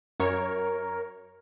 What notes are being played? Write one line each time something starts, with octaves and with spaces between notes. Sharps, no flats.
F#2 A#4 C#5